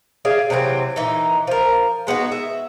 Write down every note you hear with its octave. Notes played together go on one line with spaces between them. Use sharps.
G#4 D5 E5 F5
C3 E3 F#3 C4
A#2 E3 D#4
F3 A#4
G#3 B3 D#4 F#4
E5